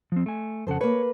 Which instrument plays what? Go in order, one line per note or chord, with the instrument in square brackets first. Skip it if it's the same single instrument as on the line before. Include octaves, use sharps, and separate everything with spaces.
[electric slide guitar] F3 C4
A3 G#5
[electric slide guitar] F2 C#3 F#5 [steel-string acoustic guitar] A4 C5
[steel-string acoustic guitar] A#3 B4 [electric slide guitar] C#5